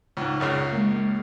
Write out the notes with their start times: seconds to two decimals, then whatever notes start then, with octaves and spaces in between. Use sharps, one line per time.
0.17 C#2 G#2
0.40 C#2 F#2 C#3
0.72 G#3 A#3